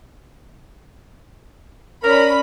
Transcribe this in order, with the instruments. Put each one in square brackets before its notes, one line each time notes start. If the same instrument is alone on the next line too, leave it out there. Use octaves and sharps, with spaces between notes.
[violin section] C#4 B5 [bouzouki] D4 [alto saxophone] A#4